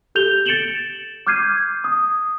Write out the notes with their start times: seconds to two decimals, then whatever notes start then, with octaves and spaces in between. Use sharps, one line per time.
0.15 G4 A4 G6 F7 G7
0.46 A6 C#7 D7 E7 F#7 G7
1.27 D6 F6 G6 G#6 C7 D#7
1.84 D#6